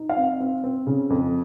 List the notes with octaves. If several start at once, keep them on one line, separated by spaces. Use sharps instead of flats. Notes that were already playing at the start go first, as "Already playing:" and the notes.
Already playing: D#4
F5
C4
C4
C4
C#3
F2